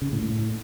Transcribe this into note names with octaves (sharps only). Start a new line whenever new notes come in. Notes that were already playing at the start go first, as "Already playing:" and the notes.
C#3
A2
A2